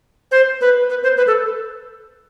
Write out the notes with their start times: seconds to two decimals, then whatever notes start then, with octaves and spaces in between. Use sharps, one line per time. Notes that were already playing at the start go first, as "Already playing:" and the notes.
0.31 C5
0.61 B4
0.90 B4
1.03 C5
1.17 B4
1.27 A4